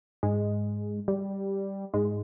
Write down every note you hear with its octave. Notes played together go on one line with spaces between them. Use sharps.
G#2 G#3
G3
G#2 G#3